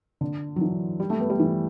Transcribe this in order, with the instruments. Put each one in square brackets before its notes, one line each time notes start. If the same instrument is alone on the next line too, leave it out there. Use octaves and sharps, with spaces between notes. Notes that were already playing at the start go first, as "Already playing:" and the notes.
[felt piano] D3
F#3
E3
G3
A3
B3
G3
E3